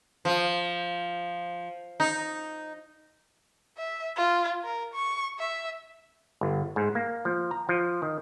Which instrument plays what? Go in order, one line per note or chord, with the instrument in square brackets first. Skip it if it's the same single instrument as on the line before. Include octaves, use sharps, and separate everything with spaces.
[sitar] F3
D#4
[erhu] E5
F4
A#4
C#6
E5
[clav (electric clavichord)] G1
G#2
A#3
F3
A#5
F3
D#3